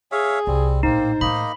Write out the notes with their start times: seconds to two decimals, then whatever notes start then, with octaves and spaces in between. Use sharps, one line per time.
0.12 G#4 C#5 E5 F5
0.47 C2 G3 C4
0.83 A#1 A2 A#3 C4 D#4 C5
1.21 A2 D#3 A#3 D#4 D#5 B5